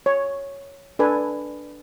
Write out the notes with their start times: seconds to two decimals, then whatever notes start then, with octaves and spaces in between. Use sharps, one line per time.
0.06 C#5
0.99 D4 A4 B4 G#5